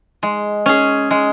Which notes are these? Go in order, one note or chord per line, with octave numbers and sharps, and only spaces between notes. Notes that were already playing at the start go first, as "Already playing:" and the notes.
G#3
C#4 G#4
G#3